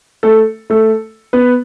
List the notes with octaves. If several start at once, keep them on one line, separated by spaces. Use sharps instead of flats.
A3 A4
A3 A4
B3 B4